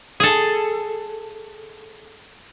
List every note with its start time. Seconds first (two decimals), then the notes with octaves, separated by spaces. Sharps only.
0.20 G#4 A4